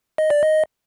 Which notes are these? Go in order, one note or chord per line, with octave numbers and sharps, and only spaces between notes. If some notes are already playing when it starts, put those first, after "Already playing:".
D#5
D5
D#5